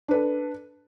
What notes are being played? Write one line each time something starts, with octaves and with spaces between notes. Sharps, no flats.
D4 A4 B4